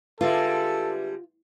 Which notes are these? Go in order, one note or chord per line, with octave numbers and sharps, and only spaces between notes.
D3 G3 G#3 F4 A4 B4 E5